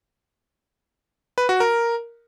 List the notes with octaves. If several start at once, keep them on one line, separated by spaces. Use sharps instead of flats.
B4
F#4
A#4